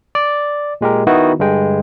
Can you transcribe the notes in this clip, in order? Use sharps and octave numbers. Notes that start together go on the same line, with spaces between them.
D5
A#2 G#3 G4 A#4
D#3 B3 D#4 E4 F#4
G2 D3 G#3 G5